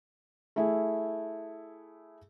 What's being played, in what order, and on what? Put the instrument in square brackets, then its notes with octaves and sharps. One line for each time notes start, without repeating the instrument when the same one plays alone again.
[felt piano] A3 E4 G#4